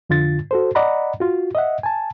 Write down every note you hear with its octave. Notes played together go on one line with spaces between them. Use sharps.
F2 D3 F4 A6
F#4 A4 C5
D5 D#5 F#5 A#5 B5
F4 F#4
D#5 E5 F#5
G#5 A5